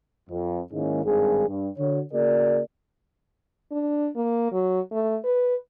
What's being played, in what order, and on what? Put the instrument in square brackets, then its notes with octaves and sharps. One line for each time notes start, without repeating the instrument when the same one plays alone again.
[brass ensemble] F2
G#2 D#3 G#3 A#3 C#4 E4
G#1 G2 G#4
G2
D3 F#4 C#5
C#3 A#3 F#4 G#4 A#4 D5
[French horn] D4
A#3
F#3
A3
B4